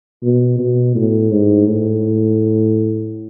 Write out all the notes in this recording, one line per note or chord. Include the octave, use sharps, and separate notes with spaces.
B2
B2
A2
G#2
A2